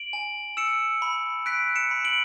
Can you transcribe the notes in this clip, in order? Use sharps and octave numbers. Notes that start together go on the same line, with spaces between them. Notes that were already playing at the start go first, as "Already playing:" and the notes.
Already playing: D7 F#7
G#5
E6 C#7 E7
B5
F#6 B6 D7
C#7 E7
B5
D7 F#7